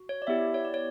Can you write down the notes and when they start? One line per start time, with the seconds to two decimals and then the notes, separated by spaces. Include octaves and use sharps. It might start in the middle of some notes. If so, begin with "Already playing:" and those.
Already playing: F#4
0.09 C#5
0.22 D5
0.27 B3 E4 G4 E5
0.54 C#5
0.65 D5
0.74 C#5